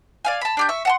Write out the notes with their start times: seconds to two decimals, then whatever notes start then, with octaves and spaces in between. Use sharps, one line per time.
0.25 D5 F5 G#5
0.41 A5 B5
0.57 D4 G4 G6
0.69 E5 C#6
0.85 F#5 A5 C6